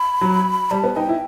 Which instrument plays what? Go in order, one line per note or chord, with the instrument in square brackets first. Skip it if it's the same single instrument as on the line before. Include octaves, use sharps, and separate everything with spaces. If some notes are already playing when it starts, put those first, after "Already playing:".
Already playing: [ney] B5
[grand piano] F#3
[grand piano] G3 [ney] A5
[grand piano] B3
[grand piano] D#4 [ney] G5
[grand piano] E4